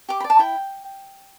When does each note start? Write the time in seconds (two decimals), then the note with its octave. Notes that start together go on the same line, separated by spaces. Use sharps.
0.09 G4 D6
0.20 B5
0.24 D5
0.30 A5
0.39 E4 G5